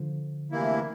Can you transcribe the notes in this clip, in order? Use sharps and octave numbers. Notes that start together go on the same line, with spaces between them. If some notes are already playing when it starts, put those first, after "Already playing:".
Already playing: D3 F3
D2 C3 E3 A#3 E4